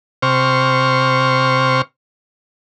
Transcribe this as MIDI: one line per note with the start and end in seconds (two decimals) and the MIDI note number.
0.22 1.82 48
0.22 1.82 72
0.22 1.82 85
0.22 1.82 89